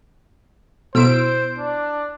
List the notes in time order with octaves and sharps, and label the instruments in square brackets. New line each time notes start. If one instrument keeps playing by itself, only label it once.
[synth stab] B2 E6 D7 [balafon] E4 A4 [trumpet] C5
[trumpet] D4